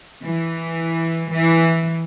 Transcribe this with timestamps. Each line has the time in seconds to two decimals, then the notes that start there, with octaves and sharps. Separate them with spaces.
0.23 E3
1.31 E3